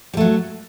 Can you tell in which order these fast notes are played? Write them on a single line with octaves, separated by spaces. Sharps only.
G3 A3 F#3